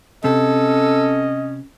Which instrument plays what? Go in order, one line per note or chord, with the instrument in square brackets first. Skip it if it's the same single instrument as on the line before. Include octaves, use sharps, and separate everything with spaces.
[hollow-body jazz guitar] C3 [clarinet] C#4 [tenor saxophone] A4 [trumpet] D#5